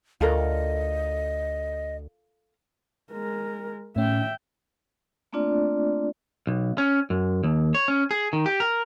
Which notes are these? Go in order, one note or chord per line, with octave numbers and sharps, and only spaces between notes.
D2 F4 A4 A#4 D#5
G#3 A#4
A2 C#4 E5 G5
A3 A#3 C4 D4 F4 D5
B1
C#4
F#2
D#2
C#5
C#4
G#4
D#3
G4
A#4